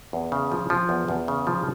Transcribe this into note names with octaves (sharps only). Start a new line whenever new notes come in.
E2
C#3
F3
F3
E2
E2
C#3
F3